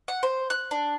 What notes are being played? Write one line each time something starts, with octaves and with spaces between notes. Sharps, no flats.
F#5
C5
F#6
D4